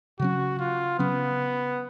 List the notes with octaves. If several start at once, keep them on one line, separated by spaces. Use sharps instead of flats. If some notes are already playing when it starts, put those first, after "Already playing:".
C#3 F#3 C#4 F#4
F4
C#3 F#3 B3 C#4